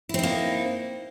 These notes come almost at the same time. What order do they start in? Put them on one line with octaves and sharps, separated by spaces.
E4 C4 D#4 A#3